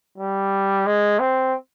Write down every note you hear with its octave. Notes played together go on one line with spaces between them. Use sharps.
G3
G#3
C4